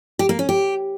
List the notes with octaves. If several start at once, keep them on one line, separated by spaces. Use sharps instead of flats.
G4
A#3
C#4
G4